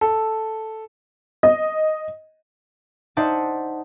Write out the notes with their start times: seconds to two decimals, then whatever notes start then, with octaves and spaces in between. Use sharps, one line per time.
0.01 A4
1.43 D#5
3.17 D#4 C5 D5 E5 F#5 A5